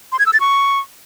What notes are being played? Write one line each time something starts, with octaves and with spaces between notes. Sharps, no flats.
C6
G#6
E6
A6
C#6